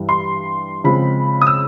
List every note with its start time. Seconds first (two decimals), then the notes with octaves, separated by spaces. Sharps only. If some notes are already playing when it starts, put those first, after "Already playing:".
Already playing: G2 E3 G3
0.09 C6
0.84 C#3 F3 G#3 C4 F4 B5
1.41 D#6
1.47 E6